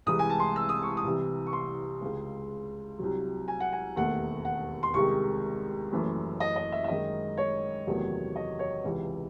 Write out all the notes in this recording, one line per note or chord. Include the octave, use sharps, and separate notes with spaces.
C2 C3 E3 G#3 D#6
G#5
A5
C6
E6
D#6
C#6
D#6
C2 C3 E3
C#6
C6
C#2 C#3 G#3
C2 C3 F#3
G#5
F#5
G#5
E1 D#2 D#3 A3 F#5
F#5
C6
C2 C3 D#3 G#3 C#6
F#1 F#2 E3 A3
D#5
D#5
E5
E5
F#2 D#3 G#3 D#5
C#5
E2 C3 D#3 F#3 A3
D#5
C#5
C#2 C3 E3